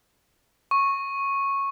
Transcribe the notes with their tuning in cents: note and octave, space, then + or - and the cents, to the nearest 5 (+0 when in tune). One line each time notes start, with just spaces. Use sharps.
C#6 -10